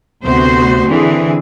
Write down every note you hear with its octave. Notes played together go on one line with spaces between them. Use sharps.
D2 C3 B3 F#4 C5
D3 E3 C4 G#4